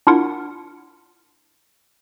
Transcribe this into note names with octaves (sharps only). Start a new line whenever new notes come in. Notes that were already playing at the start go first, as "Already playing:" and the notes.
D4 E4 F4 A#4 F#5